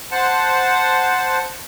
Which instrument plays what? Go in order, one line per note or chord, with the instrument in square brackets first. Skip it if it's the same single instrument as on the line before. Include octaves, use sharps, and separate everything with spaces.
[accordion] C5 F#5 A5